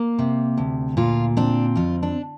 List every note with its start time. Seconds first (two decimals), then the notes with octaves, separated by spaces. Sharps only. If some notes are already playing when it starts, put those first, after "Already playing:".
Already playing: A#3
0.19 C3
0.57 D2
0.97 A#2 F4
1.37 C4 D4
1.76 F2 F4
2.03 D4